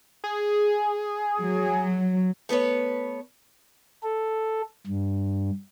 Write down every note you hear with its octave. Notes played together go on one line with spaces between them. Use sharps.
G#4
F#3
A3 B3 B4 C#5
A4
G2